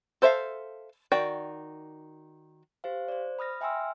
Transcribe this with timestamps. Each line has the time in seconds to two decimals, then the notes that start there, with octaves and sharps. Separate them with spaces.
0.22 A4 C5 D5 E5 F5
1.12 D#3 F#4 D5 G5
2.84 G4 C5 F5
3.08 C5 D5
3.39 B5 D#6 F6 A#6
3.61 E5 G5 G#5 C6 E6 F6